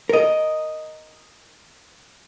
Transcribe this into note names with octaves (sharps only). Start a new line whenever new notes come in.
A#4 D#5